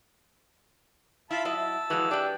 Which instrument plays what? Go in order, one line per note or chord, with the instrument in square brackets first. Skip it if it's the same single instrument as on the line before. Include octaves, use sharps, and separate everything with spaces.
[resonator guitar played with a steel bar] E4 [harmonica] F4 A5 B5
[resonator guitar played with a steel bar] F#3 E4 D#5 [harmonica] A5 E6
[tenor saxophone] E3 [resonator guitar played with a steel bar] F3 G#3 F#4
[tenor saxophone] D4 [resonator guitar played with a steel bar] G4 B4